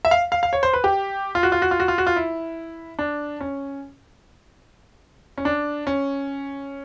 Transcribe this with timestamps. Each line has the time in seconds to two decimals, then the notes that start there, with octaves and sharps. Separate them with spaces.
0.05 E5
0.11 F5
0.32 F5
0.43 F5
0.53 C#5
0.63 C5
0.73 B4
0.84 G4
1.35 F4
1.43 F#4
1.52 F4
1.62 F#4
1.71 F4
1.80 F#4
1.88 F4
1.98 F#4
2.07 F4
2.16 E4
2.99 D4
3.41 C#4
5.38 C#4
5.45 D4
5.87 C#4